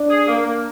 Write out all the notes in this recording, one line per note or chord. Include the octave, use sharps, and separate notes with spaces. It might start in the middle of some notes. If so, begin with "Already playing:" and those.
Already playing: D4
G#4
A#3
A#3